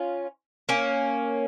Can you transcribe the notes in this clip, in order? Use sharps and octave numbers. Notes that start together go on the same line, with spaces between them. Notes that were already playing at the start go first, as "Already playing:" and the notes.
Already playing: C#4 F4
A#3 C#4